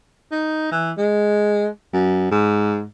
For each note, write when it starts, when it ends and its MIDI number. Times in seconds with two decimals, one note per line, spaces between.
0.32 0.70 63
0.72 0.92 52
0.98 1.68 56
1.94 2.31 42
2.32 2.85 44